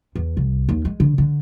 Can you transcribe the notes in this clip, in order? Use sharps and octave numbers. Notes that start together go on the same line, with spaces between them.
E2
C2
D#2
G#3
D3
D3